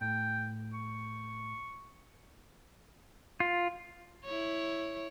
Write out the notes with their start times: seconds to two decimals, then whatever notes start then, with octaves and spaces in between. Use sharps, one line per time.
0.01 A2 G5
0.73 C#6
3.40 F4
4.25 E4 C#5